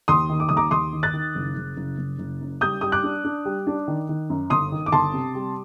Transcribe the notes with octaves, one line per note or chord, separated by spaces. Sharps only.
D#2 C6 D#6
D#3
D6
D#2 D#6
A#5 D6
D#2 C6 D#6
D#3
F#6 A6
D#3
F#1
F#1
F#1
F#1
F#1
F#2
G3 D#6 G6
G3 D#6
D6 F#6
D4
D4
G3
D4
D#3
D#3
F#2
G1 C6 D#6
D#3
D6
G1 A5 C6
C3
G3